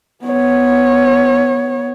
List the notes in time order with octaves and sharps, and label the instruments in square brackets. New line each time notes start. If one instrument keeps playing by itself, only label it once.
[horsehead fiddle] B3 C#5